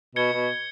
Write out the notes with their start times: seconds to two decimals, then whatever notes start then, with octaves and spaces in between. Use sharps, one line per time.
0.16 B2 G#6 C#7 G7
0.33 B2